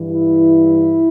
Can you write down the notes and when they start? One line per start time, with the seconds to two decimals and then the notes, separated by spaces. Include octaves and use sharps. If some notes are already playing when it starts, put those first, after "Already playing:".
Already playing: G2 E3
0.12 E4